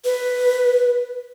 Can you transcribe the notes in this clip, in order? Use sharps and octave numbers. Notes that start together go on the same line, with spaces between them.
B4